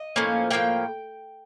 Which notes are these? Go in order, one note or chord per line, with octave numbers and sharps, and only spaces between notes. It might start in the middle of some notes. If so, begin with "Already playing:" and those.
Already playing: D#5
A2 F3 A#3 C#4
A2 F3 A#3 G5